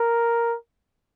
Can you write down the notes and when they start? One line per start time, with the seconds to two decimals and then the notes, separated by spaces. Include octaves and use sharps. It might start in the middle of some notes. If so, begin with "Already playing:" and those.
Already playing: A#4